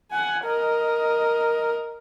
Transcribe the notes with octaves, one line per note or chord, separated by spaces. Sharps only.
F#5 G#5
A#4 D#5